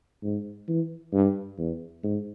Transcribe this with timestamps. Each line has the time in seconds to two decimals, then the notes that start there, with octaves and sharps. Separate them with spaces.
0.23 G#2
0.68 E3
1.13 G2
1.58 E2
2.03 G#2